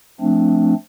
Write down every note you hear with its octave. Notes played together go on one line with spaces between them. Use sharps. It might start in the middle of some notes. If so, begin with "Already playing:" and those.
F3 A3 C4 D4